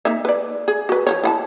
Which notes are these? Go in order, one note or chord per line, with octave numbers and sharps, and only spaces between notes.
A#3 D#4 E5
B4 D5
G#4
F#4 B4
F3 C5 C#5
E4 F#5 A5